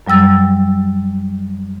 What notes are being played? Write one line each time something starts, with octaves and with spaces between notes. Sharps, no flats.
F#2 F#3 G3 E6 A6